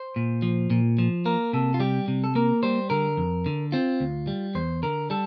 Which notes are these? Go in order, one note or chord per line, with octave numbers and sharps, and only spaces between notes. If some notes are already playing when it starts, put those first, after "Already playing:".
Already playing: C5
A#2
F3
A#2
F3
A#3 A#4
C3 A4
F4
G3 G4
C3
A4
A#3 A#4
G3 C5
D3 A#4
F2
D3
C4 F4
D2
G3
E2 C5
D3 A#4
G3 A4